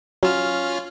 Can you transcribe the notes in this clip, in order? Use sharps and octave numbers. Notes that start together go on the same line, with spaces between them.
F#3 C#4 F4 F6 E7